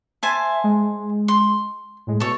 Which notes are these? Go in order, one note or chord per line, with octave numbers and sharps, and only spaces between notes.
C5 E5 G#5 A5
G#3
C6
A2 G#3
B2 A4 C#5